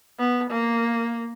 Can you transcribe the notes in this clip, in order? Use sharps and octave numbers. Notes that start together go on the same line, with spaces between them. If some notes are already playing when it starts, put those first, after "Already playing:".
B3
A#3